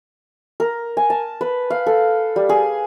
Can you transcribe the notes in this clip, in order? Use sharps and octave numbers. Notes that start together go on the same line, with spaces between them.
A#4
G#5
A5
B4
F5
A4
G3
G#4